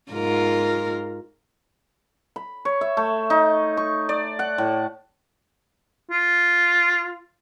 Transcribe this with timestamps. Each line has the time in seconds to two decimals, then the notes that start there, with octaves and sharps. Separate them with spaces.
0.11 G#2 F4 A#4
2.36 B5
2.65 C#5
2.81 E5
2.97 A3
3.30 D#4
3.77 C#6
4.09 D5
4.39 F#5
4.58 A2
6.11 F4